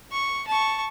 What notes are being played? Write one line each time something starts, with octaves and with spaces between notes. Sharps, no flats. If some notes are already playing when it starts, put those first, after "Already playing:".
C#6
A5 C#6